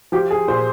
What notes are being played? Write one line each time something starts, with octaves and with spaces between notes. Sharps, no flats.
F3 G4
G#4
A#2 C5